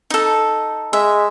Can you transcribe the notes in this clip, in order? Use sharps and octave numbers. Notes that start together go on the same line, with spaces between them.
D#4 A4
G#3 E5